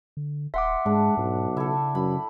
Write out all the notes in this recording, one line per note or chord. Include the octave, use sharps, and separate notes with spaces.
D3
D#1 E5 F#5 C6 D6
G#2 G#3 D4
B1 G#2
C#3 E4 A4
F#2 B5